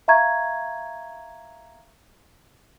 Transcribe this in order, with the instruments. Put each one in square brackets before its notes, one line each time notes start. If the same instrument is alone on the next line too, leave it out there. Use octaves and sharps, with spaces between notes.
[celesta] E5 F5 A#5 C#6 G#6